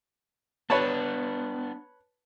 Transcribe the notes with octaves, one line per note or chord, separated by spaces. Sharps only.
B3 D4 B4 C#5 A5